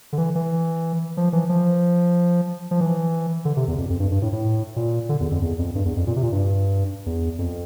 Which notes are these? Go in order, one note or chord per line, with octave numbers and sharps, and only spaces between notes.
D3
E3
E3
F3
E3
F3
F3
E3
D3
C3
E2
F2
F2
G2
G2
A2
A2
A#2
D3
E2
F2
E2
F2
G2
E2
F2
A#2
C3
A#2
G2
E2
F2